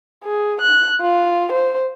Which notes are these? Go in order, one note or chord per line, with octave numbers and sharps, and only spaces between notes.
G#4
F#6
F4
C5